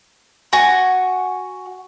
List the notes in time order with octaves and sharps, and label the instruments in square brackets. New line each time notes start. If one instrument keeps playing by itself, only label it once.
[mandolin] F#4 F#5 G#5 C#6